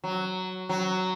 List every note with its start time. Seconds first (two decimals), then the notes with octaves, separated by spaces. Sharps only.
0.04 F#3
0.69 F#3